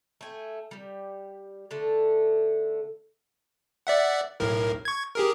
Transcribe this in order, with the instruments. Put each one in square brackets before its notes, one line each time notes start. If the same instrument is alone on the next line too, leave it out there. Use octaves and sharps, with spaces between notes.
[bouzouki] A3 G5 G#5
G3 G4
D3 A3 A4 A5
[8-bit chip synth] D5 E5 F#5
B1 A2 A#4
C#6 G#6
G4 G#4 A#4